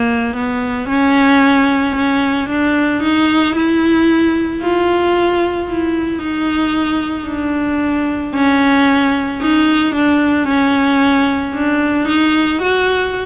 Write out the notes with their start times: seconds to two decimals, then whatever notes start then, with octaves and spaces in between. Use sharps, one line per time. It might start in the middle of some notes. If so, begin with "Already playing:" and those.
Already playing: A#3
0.36 B3
0.89 C#4
1.96 C#4
2.49 D4
3.03 D#4
3.56 E4
4.62 F4
5.69 E4
6.22 D#4
7.28 D4
8.35 C#4
9.42 D#4
9.95 D4
10.48 C#4
11.55 D4
12.08 D#4
12.62 F#4